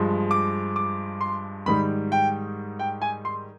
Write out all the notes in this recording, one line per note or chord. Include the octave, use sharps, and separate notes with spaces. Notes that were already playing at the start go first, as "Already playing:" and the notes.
Already playing: G2 F3 G#3
D6
D6
C6
G#2 D#3 G3 B5
G5
G5
G#5
C6